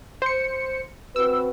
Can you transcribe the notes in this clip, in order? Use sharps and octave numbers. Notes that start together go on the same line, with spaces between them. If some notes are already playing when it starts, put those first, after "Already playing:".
C5 C#7
C4 F#4 B4 E6